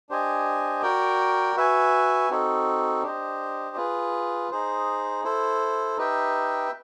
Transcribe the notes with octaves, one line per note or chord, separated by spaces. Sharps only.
D4 G4 C5 D#5 G#5
F#4 A#4 D5 G5
F#4 B4 E5 G#5
C4 D#4 F#4 A4
D4 G4 C5 D#5
F4 G#4 B4
D#4 G#4 C5
E4 A4 C5
D#4 G4 B4 E5 G5